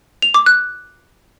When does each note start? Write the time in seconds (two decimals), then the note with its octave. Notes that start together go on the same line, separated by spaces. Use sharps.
0.22 F7
0.34 D6
0.46 F#6